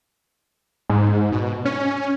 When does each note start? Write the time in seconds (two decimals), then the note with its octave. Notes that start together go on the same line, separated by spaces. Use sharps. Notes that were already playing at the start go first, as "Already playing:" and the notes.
0.89 G#2
1.32 B2
1.65 C#4